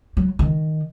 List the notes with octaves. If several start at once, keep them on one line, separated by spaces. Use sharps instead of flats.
F#3
D#3